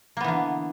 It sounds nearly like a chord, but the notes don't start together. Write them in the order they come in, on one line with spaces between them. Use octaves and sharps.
A#3 B3 E3 D3